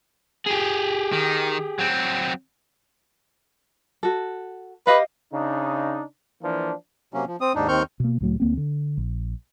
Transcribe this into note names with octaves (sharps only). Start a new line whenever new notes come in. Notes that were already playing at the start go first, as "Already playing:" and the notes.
G4 G#4
D#3
F#3 C4
F#4 A4
G4 B4 D#5 F5
C#3 D4 D#4
E3 F3 A#3 D4
C3 F#3 A#3 C#4
F3
C4 D#6
D#2 G#2 D4 D#4
D#2 D#3 C4 C#6 F6 G6
B2 A#3
C#2 A2 F#3 A3
D2 A#3 C4
D3
A#1